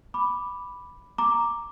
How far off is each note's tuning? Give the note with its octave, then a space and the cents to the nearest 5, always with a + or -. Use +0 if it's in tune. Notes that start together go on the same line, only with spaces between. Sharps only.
B5 +0 D6 +0
A#5 +0 D6 +0